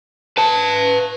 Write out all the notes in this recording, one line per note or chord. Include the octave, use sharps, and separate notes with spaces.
B4 A5